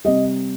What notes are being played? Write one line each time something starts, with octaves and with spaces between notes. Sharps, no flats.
C3 G3 D#5